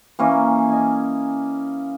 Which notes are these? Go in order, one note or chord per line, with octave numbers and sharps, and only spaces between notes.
E3 A#3 C#4
D#5 G#5